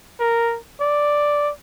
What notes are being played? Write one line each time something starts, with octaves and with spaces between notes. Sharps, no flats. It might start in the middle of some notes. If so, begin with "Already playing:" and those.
A#4
D5